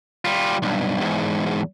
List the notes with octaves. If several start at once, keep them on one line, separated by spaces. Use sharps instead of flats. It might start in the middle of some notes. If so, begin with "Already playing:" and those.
G3 F4
B1 G2
E2 G#2